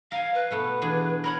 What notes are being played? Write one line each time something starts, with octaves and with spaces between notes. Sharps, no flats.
A#4 F5 G#5
B4
B2 A3 B3
E2 D4 G#4
A#4 C#5 F#5 B5